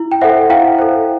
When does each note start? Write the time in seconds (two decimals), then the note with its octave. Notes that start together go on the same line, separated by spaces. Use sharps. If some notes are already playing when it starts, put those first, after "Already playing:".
Already playing: E4
0.12 G5
0.21 A4 C5 E5 F#5
0.50 E4 F5 G5
0.78 A4 C5